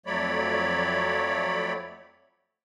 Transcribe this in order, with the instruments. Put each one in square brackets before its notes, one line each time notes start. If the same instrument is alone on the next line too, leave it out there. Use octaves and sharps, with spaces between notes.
[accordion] F2 F#3 A3 C#5 D5 B5